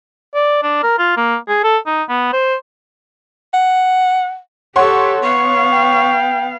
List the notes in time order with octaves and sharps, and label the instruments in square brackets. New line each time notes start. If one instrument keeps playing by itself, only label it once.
[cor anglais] D5
D4
A#4
F4
A#3
G#4
A4
D#4
B3
C5
[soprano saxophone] F#5
[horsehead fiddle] G4 A4 [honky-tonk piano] C#5 F#5 C6 [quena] C#6
[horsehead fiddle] B3 F5 [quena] C#6
[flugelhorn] G5